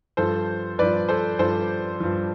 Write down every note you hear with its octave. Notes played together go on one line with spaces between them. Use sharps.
G2 F3 A4 C5
G2 F3 B4 D5
A4 C5
G2 F3 A4 C5
G2 F3